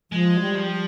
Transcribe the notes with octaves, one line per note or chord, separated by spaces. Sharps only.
F3 G#3
G3
F3
G3